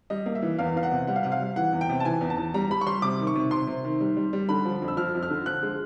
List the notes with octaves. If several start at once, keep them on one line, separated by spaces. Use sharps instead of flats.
G3 D#5
A#3
E5
E3
E2 F5
E2 F5
F#5
C3
G3 F#5
F5
C3 F#5
F5
G3
E3 F#5
E2
G5
C3
A5
E3 G#5
E2
A5
E2
G3 A#5
G3 B5
C#6
G3 C6
C3 D6
D#3
C#6
C3
C3 C6
C3
D#3
G3
G3
G3
D3 B5
F3
F2
E6
F3 F6
F2
F6
D3
F3 F#6
G#3